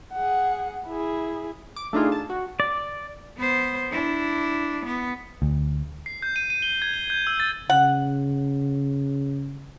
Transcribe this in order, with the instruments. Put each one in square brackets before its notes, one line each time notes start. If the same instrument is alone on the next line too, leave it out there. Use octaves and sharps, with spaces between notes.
[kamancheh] G#4 F#5
E4 G#4
[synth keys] D6
A3 D4 D#4 F4 G#4
A5
F#4
[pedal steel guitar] D5
[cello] B3 C5
D4 E4
B3
[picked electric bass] D2
[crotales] C7
G6
D#7
D#7
G7
G#6
G7
G6
E6
A6
[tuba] C#3 [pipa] F#5